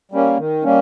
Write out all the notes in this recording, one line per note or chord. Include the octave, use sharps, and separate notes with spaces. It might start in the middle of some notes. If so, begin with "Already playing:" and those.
G3 A#3 C#4
D#3
G3 A#3 C#4